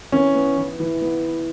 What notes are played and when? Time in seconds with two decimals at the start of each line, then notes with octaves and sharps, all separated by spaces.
0.12 E3 C#4
0.35 B3
0.57 E3
0.80 E3
1.01 B3